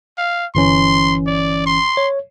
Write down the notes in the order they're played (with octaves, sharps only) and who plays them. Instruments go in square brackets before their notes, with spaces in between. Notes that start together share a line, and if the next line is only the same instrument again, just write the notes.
[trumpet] F5
[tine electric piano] G1 E3 C#4 [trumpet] C6
[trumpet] D5
C6
[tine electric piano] C#5